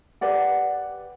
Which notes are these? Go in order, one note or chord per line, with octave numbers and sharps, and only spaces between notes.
G4 B4 D5 F#5